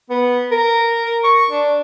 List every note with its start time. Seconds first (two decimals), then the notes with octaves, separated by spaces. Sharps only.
0.10 B3
0.51 A#4
1.24 C#6
1.50 D4